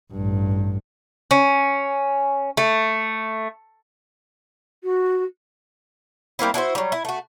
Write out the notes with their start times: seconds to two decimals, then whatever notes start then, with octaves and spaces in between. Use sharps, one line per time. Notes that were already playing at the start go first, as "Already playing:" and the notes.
0.13 A1 G2
1.31 C#4
2.57 A3
4.83 F#4
6.39 G3 A#3 C4 E4
6.54 D4 E4 F#4 C5
6.75 F#3 G3
6.92 E4
7.05 A3 F#4